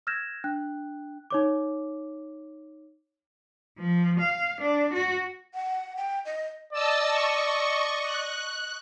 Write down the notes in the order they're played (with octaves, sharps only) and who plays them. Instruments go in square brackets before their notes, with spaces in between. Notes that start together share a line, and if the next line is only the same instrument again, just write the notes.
[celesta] E6 F6 G6 G#6 A#6 E7
D4 G5 F#6
D#4 C#5 D6
[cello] F3
F5
D4
F#4
[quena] F#5
G5
D#5
[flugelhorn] D5 [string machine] D#5 A5 E6
[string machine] D#5 C#6
F#6